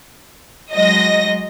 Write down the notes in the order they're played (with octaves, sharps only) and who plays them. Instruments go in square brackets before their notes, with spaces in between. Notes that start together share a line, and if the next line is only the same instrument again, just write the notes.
[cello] F#3 G#3 [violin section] D#5 A#6